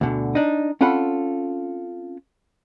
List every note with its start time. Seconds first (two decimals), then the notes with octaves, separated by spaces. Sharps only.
0.01 D2 B2 D3
0.35 D4 D#4
0.81 C4 C#4 F4 A4 F#5 B5